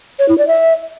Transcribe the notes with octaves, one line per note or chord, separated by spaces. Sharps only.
C#5
E4
D5
E5